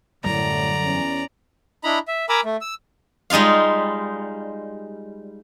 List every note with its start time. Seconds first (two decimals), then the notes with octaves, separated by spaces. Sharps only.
0.24 F#2 A2 D3 F#3 G3 D5 A#5
0.84 E2 C#4
1.83 D4 E4 D#5 A#5 B5
2.08 E5
2.29 A#4 G#5 A#5 B5 D6 E6
2.45 A3
2.61 E6
3.30 G3 G#3 D#4 F4 F5